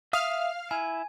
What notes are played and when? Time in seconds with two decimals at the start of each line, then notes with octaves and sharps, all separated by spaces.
0.13 E5 F5 D#6 F6
0.71 E4 G#5